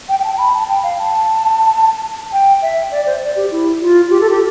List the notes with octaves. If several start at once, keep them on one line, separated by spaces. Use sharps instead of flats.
G5
G5
A5
A5
B5
A5
G5
F5
A5
G5
E5
D5
C5
D5
G4
E4
F4
G4
A4
G4